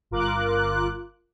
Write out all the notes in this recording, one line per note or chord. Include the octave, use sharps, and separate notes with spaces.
G1 F4 A#4 D6 F#6